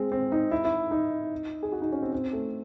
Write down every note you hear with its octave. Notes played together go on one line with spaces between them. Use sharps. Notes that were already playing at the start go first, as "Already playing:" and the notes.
Already playing: G#3 C4
C4
D#4
E4
E4
D#4
G#4
F#4
D#4
C#4
C4
C4
A3